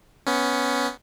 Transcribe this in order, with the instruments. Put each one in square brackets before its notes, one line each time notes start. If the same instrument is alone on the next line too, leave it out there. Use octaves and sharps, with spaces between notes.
[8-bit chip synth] B3 C#4